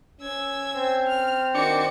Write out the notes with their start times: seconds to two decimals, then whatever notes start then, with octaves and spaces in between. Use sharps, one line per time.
0.21 C#4 E6 G#6
0.75 C4
1.07 F6
1.55 D#3 D4 F#4 C#7